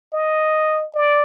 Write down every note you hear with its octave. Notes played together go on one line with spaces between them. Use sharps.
D#5
D5